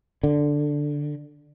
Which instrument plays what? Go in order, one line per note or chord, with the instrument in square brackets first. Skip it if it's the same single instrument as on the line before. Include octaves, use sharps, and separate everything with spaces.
[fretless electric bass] D3